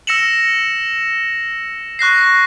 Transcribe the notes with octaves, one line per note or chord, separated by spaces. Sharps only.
E6 A#6 C#7 E7 F#7
C#6 F#6 A#6 C7